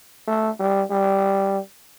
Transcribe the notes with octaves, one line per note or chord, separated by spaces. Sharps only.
A3
G3
G3